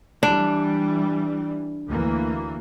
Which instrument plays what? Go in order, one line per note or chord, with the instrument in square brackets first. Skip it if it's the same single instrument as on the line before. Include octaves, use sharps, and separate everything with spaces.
[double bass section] E3 G3 [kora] D4
[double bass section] D2 E3 A#3